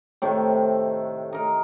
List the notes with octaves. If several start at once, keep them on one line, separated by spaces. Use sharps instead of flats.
A2 C3 D#3 A3
D#4 A#4 D#5